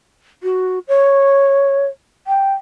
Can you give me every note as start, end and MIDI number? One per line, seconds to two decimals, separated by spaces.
0.43 0.79 66
0.88 1.85 73
2.27 2.53 79